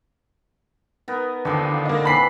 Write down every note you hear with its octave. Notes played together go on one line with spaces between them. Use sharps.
B3 D#4 A#4
D#2 D3 F3 D#4 E4
A#3 D#5
E3 C4 D4 B5 B6 C7